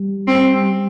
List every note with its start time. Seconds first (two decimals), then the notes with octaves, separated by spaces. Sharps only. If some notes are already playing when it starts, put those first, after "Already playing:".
Already playing: G3
0.28 C4